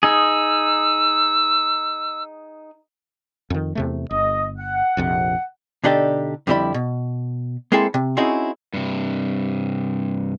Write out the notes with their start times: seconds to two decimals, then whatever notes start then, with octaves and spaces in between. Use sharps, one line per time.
0.03 D#4 G#4 E6
3.50 F2 D#3
3.75 E2 C3 A3
4.11 G1 D#5
4.58 F#5
4.97 A#1 F2 C3
5.84 B2 D3 D4 D#4 G4 A4
6.47 F2 D3 G3 E4 G4 B5
6.74 B2
7.72 G#3 A#3 C4 E4 G#4 A4
7.94 C3
8.17 C4 C#4 D#4 E4 F#4 G#4
8.74 G2 C3